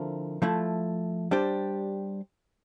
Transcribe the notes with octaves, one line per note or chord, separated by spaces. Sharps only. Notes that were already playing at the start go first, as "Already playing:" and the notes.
Already playing: D3 F3 C4 E4 A#4
F3 A3 E4
G3 D4 G4 C5